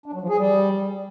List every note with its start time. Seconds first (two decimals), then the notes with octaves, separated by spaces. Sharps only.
0.06 D4
0.14 F#3
0.22 F3
0.29 G#4
0.37 G3